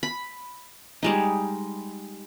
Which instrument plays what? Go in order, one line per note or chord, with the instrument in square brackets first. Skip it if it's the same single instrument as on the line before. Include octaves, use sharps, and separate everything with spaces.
[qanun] B5
G3 G#3 D#4